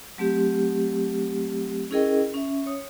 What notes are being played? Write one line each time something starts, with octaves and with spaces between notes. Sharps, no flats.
F#3 A3 C4 G4
C#4 E4 G#4 A#4 D#5 G5
C#4 E5
C#5 D#6